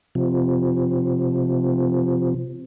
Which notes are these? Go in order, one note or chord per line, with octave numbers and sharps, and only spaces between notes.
C3 F3